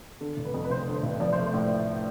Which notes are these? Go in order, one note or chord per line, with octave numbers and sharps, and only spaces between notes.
D3 A4
F1
B4
F2
B4
F1 C5
D3
C5
F1
F3 D5
C5
A3
C5
A2